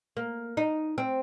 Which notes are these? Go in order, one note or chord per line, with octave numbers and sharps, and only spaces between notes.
A#3
D#4
C4